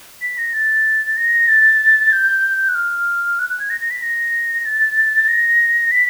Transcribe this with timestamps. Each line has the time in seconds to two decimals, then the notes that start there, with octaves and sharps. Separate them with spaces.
0.22 B6
0.38 A#6
0.53 A6
1.17 A#6
1.48 A6
2.12 G6
2.69 F#6
2.75 F6
3.39 F#6
3.50 F#6
3.59 G#6
3.70 A#6
3.81 A#6
3.91 B6
4.02 A#6
4.65 A6
5.28 A#6
5.91 B6